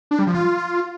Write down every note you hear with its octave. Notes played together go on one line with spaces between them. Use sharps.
D4
G3
F3
F4